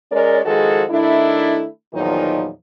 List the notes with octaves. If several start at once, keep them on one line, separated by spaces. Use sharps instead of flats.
G#3 C#4 A#4 C#5 D5
D#3 F3 G#3 F#4 G#4 A4
D#3 A3 D4 E4
E2 A#2 D#3 F3 F#3 D#4